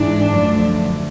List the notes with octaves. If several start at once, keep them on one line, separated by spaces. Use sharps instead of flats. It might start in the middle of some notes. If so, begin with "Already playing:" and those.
Already playing: G#2 E3 G#3 D4
F#2 D3 F3 A3